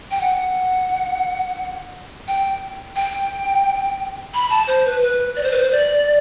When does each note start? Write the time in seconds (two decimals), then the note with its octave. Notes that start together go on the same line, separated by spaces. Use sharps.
0.11 G5
0.21 F#5
2.28 G5
2.96 G5
4.34 B5
4.50 A5
4.67 C5
4.85 B4
5.02 B4
5.36 D5
5.43 C5
5.52 B4
5.58 C5
5.72 D5